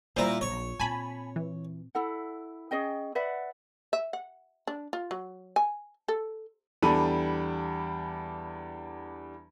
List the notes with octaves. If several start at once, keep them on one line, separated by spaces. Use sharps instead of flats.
A#2 G3 E4 C5 A#5
A#1 C#5
A#2 C4 G#5 A5 B5
E3
E4 A4 F#5
C#4 G#4 D#5 G5
B4 D5 E5 F#5
E5
F#5
D4
F4
F#3
G#5
A4
E2 G3 D4 A4 B5 D#7